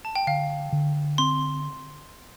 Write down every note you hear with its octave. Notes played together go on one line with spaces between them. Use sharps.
A5
G5
D3 F5
D3
C4 C6